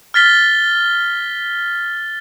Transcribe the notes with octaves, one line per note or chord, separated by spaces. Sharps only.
F6 A6 B6 G7